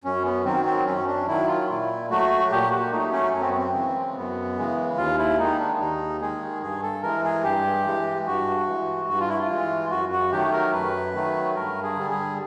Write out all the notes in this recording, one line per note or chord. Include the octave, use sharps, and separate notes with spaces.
F#2 C#4
B3
D#3 F#3 C4
C4
F#2 C#4
D4
D#3 F#3 E4
F4
A#2 E4
F#3 A3 F#4
A#2 G4
F#4
F#3 A3 D#4
C#4
F#2 C#4
C4
B3
C4
C#3 E3 G#3
F#2 B3
C#3 E3 G#3
D#2 F4
E4
D#3 G#3 D#4
D4
D#2 D#4
D#3 G#3 G#4
G2 G#4
A4
E3 G#3 A#4
G#4
G2 G4
E3 G#3
G2 F#4
E3 G#3
G2 F#4
F4
E4
F4
E3 G#3
F#2 F#4
F#4
D#3 F#3 A3 G4
A#4
F#2 B4
D#3 F#3 A3
G2 A#4
G#4
D3 G3
G#4